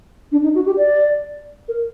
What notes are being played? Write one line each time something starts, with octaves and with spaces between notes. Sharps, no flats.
D4
D#4
F#4
G4
D5
A#4